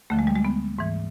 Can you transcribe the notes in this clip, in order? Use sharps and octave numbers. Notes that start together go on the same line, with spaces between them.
D2 D3 F3 A3
G#3
G3
G#3
B3
G#2 E3